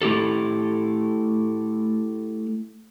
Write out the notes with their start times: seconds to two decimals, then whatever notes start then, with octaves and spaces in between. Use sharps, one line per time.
0.02 A3 E4 G4 A4